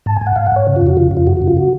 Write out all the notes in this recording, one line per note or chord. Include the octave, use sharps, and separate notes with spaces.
G#2 A5
G#5
G#2
F#5
G#2 F5
F#5
G#2 C#5
C#3
F4
F2
F#4
C#3 F4
F2
F4
F#2 F#4
C#3 F#4
F4
F#4